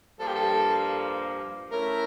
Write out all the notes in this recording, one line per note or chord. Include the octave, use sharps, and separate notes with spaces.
G2 F3 A#3 A4
G4
A4
A3 C#4 E4 A#4